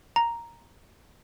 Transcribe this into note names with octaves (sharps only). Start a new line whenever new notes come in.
A#5